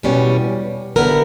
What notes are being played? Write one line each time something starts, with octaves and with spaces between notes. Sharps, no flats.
E2 B2 G3 C#4
D3 G3 B3 E4 A#4